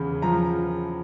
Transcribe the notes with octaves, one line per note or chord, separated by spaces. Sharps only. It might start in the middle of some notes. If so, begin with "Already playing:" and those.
Already playing: E2 C#3 B5
F3 A#5